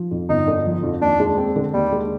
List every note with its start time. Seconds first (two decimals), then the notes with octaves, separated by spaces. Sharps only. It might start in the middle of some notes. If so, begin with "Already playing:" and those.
Already playing: F3
0.11 F2
0.29 G1 D#4
0.47 D3
0.65 F3
0.83 F2
1.01 D#2 D4
1.20 G#3
1.37 C4
1.56 D3
1.74 D#2 G3
1.92 G#3